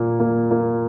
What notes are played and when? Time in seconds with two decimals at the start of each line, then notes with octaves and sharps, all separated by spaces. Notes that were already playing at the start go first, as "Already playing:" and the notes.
Already playing: A#2 A#3
0.20 A#3
0.51 A#3